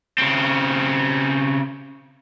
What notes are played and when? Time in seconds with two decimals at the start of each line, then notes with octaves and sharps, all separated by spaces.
0.18 C#3 C4